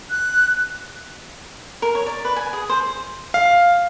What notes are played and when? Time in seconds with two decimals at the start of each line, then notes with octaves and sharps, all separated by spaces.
0.10 F#6
1.82 A#4
1.95 C#5
2.06 D5
2.25 B4
2.36 G#5
2.53 G#4
2.69 C5
3.34 F5